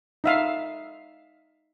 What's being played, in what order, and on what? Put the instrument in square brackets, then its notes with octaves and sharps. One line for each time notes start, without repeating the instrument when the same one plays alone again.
[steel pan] D#4 E5 F5